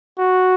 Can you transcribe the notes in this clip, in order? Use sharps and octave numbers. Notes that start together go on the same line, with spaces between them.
F#4